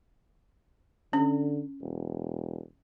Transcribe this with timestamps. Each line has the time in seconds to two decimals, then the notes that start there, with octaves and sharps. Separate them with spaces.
1.13 D3 C#4
1.82 E1